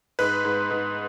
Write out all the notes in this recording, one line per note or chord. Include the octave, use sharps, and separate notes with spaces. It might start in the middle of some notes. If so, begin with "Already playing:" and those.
G#2 B4
G#2
G#2